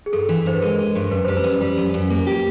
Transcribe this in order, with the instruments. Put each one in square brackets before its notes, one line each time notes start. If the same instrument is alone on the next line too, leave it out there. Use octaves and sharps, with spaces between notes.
[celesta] G#4
[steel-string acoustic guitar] G2 [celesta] A4
[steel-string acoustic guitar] E3
[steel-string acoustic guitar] G2 [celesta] C5
[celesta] B4
[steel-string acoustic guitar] G#3 [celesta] A#4
[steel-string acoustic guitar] G#3
G2
[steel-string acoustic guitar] F#2 [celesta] B4
[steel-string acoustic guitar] G3 [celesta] C5
[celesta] B4
[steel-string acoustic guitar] F#2
G3
F#2
F#2
A#3
G4